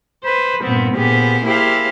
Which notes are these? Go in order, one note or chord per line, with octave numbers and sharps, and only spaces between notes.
B4 C5
G2 A#2 B3 C4
A#2 B3 G4 G#4 C5
A#3 E4 G4 G#4 C5 F5